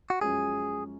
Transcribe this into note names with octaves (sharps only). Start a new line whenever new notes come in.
F#4
F#2 F3 G#3 C#4 G#4